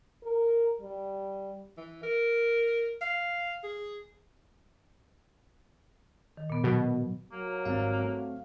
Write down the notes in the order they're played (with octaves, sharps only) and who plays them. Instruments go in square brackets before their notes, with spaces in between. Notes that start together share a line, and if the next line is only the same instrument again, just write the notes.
[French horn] A#4
G3
[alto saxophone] E3
A#4
F5
G#4
[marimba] D#3
A#2 B3
[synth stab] B2 [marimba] F#3
[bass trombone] F#3 [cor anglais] A#3
[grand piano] G#1 G3 [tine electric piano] C4 F5
[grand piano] A3